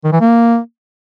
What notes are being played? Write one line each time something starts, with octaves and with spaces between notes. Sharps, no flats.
D#3
E3
A#3